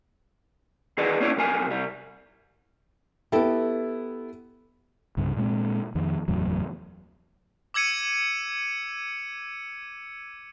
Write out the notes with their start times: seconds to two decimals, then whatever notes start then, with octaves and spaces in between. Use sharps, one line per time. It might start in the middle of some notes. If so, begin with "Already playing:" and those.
0.97 D#3 E3 G#4 B4 D5 D#5
1.20 A#3 C#4 E4 C#5 D5
1.36 B1 F2 A#4 G#5
1.66 C3 G3
3.32 B3 E4 G4 A4
5.17 C2 G2 C#3
5.37 A#2 G#3 A#3 C4
5.95 F2 D#3
6.28 F#1 E2 A2 F#3
7.74 D6 E6 G#6 C#7 D#7